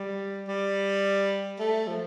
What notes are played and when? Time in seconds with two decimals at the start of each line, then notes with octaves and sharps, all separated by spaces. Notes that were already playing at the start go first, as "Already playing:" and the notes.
Already playing: G3
0.48 G3
1.59 A3
1.87 F3